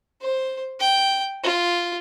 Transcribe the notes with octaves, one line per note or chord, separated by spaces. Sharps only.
C5
G5
F4